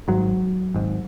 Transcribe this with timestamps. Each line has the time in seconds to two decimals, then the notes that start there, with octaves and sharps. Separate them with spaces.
0.08 G#1 G#2 F#3
0.74 G#1 G#2